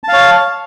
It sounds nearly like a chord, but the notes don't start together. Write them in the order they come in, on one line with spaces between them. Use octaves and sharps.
A5 F5 C#5